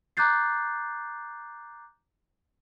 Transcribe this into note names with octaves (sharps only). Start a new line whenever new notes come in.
A#5 D6 F#6 G6 A6 C7